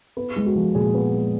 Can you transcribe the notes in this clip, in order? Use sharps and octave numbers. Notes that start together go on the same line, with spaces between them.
B3 B4
G#3
F#4
F3
A#2 G#4
B3
G#3